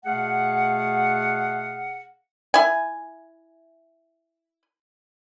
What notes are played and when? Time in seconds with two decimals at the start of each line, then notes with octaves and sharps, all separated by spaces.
0.05 B2 A3 G#4 F5 F#5
2.54 E4 G#5